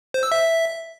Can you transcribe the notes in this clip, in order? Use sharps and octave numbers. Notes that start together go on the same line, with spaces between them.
C5
E6
E5